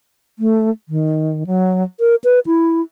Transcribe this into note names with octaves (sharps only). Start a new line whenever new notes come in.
A3
D#3
F#3
A#4
B4
E4